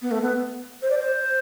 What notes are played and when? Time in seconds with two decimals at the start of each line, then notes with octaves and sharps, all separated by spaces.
0.02 B3
0.11 A3
0.22 B3
0.82 C5
0.90 D5
0.99 C5